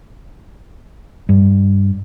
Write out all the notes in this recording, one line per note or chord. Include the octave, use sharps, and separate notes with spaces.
G2